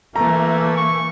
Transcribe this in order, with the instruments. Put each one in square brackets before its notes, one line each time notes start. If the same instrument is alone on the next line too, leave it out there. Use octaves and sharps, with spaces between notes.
[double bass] E3 A#3 [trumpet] A3 [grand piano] A#5
[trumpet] C#6